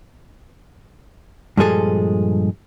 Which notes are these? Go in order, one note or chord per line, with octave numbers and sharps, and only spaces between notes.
G2 A#2 F3 G#3 G#4 A4